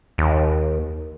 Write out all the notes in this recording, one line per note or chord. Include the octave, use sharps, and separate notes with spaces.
D#2